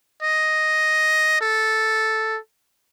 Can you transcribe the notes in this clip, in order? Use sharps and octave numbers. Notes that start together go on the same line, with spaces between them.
D#5
A4